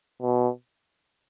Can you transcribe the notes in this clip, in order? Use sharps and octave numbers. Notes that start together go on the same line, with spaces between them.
B2